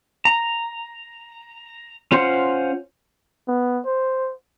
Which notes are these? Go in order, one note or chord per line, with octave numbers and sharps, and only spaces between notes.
A#5
C#4 F4 C5 F#5
B3
C5